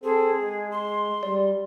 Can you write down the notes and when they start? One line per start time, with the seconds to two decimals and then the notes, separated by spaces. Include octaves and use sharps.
0.04 C4 G#4 A4 C5
0.40 G#3
0.71 C6
1.23 G3 D5